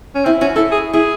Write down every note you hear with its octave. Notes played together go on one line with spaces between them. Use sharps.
C#4
C4 E4
C#4 F#4
E4 A4
G#4
E4 G#4